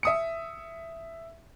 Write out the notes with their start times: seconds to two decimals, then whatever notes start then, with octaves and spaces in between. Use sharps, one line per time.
0.03 E5 D#6 C#7